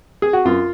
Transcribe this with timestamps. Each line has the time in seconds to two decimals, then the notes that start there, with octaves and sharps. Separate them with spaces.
0.22 G#4
0.33 F#4
0.45 F#2 F4